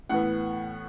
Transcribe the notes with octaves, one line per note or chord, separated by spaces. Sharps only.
A2 E3 B3 F#5